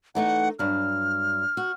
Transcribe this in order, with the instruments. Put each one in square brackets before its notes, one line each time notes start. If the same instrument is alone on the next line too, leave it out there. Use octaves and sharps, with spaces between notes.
[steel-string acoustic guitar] E3 A3 D#4 [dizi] F#5
[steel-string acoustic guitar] G2 F#3 [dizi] F6
[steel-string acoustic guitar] F#4